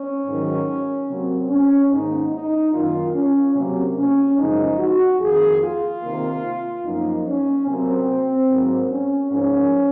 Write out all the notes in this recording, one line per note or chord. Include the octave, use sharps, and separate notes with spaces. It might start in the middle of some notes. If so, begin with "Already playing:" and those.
Already playing: C#4
G#2 D#3 F#3
C3 F#3 A#3 C4
C#4
G#2 D#3 A#3 D#4
D#4
F#2 D#3 A#3 F4
C#4
C3 F#3 A#3
C#4
F#2 C#3 F3 G#3 D#4
F#4
F2 D#3 A#3 G#4
F4
C3 D#3 A#3
F#2 F3 A#3 D#4
C#4
C3 F#3 A#3 C4
G#2 F#3 A#3
C#4
G#2 F3 A#3 C#4